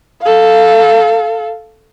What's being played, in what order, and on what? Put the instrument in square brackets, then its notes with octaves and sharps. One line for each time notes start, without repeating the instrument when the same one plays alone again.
[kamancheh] A4 F5